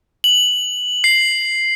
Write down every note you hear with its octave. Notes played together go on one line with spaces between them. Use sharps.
F#7
C7